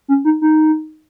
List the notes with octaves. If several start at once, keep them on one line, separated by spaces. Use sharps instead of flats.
C#4
D#4
D#4